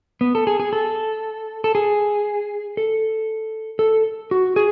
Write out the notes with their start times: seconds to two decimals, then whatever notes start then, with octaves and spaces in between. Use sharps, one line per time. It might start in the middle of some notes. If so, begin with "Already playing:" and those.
0.21 B3
0.35 A4
0.47 G#4
0.60 G#4
0.73 A4
1.64 A4
1.75 G#4
2.77 A4
3.79 A4
4.31 F#4
4.56 G#4